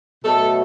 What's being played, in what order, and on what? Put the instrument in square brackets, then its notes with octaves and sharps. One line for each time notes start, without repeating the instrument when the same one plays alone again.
[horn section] B2 F#3 A3 A4